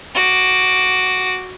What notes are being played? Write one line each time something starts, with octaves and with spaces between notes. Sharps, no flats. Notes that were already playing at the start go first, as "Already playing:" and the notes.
F#4 D6